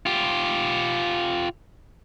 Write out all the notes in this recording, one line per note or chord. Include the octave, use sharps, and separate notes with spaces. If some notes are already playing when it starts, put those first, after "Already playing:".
F4 G4